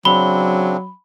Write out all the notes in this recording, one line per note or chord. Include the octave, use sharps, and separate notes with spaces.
C#3 F#3 C4 D4 B5 G7